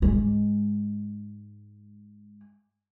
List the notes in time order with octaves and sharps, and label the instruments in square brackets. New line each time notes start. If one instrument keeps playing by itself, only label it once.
[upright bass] G#2 G#3